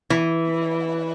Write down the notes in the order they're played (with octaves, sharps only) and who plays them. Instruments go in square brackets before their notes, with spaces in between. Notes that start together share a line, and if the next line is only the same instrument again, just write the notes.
[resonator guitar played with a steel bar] E3